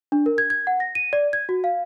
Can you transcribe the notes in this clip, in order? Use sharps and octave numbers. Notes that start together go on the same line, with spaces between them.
D4
A#4
G#6
G#6
F#5
A#6
D#7
D5
G#6
F#4
F5